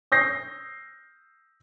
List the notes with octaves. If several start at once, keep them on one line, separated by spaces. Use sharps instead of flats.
D#6 G6 A#6 C7